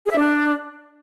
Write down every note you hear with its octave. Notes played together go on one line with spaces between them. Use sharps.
G#4
E5
D4